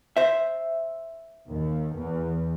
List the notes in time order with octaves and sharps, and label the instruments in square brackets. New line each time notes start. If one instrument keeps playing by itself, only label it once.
[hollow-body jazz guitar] C5 E5
[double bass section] D#2
E2